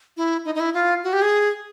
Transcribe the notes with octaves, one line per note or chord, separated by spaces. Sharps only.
E4
D#4
D#4
E4
F4
F#4
G4
G#4